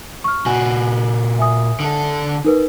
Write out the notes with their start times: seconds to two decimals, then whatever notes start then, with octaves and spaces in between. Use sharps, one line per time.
0.24 C#6 F6
0.46 A#2 F#4 G#5
1.39 E5 G#5 D#6
1.80 D3 A4
2.45 D#4 A#4 B4